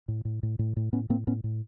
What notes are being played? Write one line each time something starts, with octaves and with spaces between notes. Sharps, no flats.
A2
A2
A2
A2
A2
A2 B3 C#4
A2 A#3 C4
A2 B3 C#4
A2